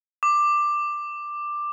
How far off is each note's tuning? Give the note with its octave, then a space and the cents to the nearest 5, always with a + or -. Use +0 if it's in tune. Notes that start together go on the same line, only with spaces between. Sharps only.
D6 +10